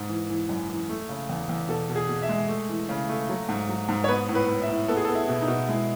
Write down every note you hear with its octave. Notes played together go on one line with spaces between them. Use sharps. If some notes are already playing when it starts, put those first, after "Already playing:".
Already playing: G#2
E3
E3
F#2
E3
A3
C#3
E2
E2
B2 A4
B2
G#4
B2
E5
G#3
A3
E3
C#3
A3
F#3
G#2
F#3
G#2
C#5
B3 B4
A2
B4
A2
E5
A2
B3 A4
G#4
A4
B3
E4
B2
D#4
B2
G#3 E4